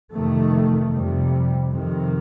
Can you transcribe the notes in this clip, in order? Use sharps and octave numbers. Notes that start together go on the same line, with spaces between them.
F2 C3 D#3 A3
F2 C3 G3
F2 C3 D#3